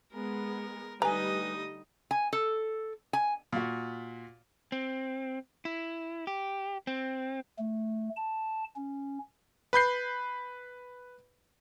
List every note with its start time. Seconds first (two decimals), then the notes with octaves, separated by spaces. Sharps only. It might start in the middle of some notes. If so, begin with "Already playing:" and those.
0.13 G#3 B3 G#4 A#4
1.02 D3 G3 A3 D#4 B4 D#5 G#5 A#5
2.11 G#5
2.33 A4
3.13 G#5
3.53 A#2 F#4
4.72 C4
5.65 E4
6.27 G4
6.87 C4
7.59 A3
8.16 A5
8.76 C#4
9.73 B4 B5 G6 C7